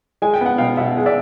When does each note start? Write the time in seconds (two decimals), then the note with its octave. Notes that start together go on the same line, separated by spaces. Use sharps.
0.22 G#3 G#5
0.34 G5
0.41 B3 F#5
0.58 B2 F5 G5
0.77 B2 E5 F#5
0.97 G#3
1.06 D5 E5